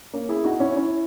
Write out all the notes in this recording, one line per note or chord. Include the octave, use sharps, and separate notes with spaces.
A#3 C#4
E4 G#4
D#4 F#4
C#4 E4
C#4 E4